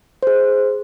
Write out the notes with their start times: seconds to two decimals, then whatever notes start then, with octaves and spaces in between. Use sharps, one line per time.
0.23 G#4 C5